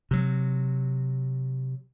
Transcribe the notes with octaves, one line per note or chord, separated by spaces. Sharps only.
C3 F#3